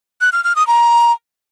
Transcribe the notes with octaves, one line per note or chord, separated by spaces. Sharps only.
F#6
F6
F6
D#6
A#5